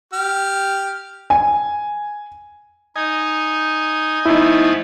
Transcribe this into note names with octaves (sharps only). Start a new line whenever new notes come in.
G4 F6
G#5
D#4 D#5 G#5
F3 A3 B3 D#4 E4